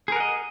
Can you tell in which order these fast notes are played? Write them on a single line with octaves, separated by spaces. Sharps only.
G#4 A#4 F#5 D#5